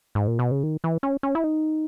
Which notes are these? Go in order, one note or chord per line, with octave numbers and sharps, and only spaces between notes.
G#2
A#2
B2
C#3
D#3
E3
C#4
C#4
E4
D#4